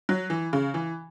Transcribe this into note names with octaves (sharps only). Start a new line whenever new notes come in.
F#3
E3
C#3
E3